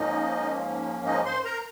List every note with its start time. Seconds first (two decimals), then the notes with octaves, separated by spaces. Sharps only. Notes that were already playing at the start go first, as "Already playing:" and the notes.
Already playing: G#2 F3 A#3 C#4 D#4 D#5
1.06 D#4 D#5
1.25 C5 C6
1.44 A#4 A#5